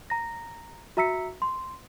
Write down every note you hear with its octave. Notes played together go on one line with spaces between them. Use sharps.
A#5 A#6
F#4 E5 A#5 E6 B6 C#7
C6